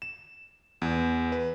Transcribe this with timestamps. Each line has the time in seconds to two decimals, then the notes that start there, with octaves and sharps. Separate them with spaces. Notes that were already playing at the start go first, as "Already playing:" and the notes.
0.02 E7
0.82 E2
1.32 B4